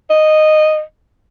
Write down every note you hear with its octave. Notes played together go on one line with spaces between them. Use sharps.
D#5